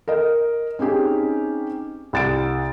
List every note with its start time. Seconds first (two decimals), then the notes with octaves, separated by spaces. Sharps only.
0.08 A#4 D#5
0.79 C4 C#4 D#4 G4 G#4
2.13 C2 A6 D7